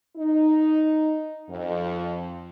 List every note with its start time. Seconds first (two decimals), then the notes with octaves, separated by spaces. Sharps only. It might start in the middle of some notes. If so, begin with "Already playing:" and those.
0.17 D#4
1.49 F2